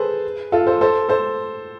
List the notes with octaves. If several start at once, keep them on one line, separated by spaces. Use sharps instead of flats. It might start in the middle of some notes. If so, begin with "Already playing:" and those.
Already playing: G#4 A4 B4 C5
F4 A4
A4 C5
A4 C5
A4 C5